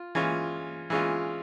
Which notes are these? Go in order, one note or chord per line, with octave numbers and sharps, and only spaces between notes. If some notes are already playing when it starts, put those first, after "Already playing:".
Already playing: F4
E3 G#3 C#4 F4
E3 G#3 C#4 F4